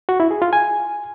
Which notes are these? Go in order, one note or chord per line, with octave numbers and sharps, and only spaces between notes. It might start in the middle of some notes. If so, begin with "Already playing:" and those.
F#4
E4
G#4
F4
G#5